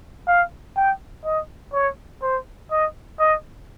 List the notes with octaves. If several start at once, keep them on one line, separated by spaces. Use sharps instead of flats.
F5
G5
D#5
C#5
C5
D#5
D#5